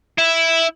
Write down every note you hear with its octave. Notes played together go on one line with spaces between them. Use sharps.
E4